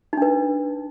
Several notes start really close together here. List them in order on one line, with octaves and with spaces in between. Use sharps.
D#4 D4 B4